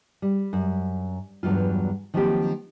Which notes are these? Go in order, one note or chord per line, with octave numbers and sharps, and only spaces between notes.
G3
F#2
E2 G2 F#3 F4
D#3 F3 F#3 A#3 C4 G4